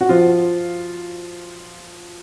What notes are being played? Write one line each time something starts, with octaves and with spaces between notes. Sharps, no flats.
F#4
F3 F4